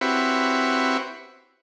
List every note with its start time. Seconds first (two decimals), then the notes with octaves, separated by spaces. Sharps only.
0.01 C4 E4 F#4 G4 B4 C#5